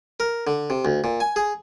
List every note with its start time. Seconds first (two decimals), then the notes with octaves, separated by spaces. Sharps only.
0.20 A#4
0.47 D3
0.70 C3
0.85 D2
1.04 A#2
1.20 G#5
1.36 G#4